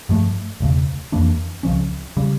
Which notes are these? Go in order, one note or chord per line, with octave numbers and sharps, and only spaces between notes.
G2 F3 A3
E1 D2 C#3
F2 E3 A#3 D4
C#2 C#3 F3 C#4
C#3 G3